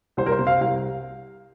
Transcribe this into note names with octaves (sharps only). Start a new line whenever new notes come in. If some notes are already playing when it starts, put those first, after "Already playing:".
C2 C5
A#4
C5
C3
F5
C2 F5